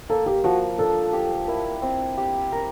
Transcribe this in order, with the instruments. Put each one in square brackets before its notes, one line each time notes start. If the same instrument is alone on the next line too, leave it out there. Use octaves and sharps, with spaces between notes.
[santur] A#3 [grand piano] A4
[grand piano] G4
[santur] F3 [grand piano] F#4
[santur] D4 [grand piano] A4
[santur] G4
[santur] E4 [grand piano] A#4
[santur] C4
G4
A#4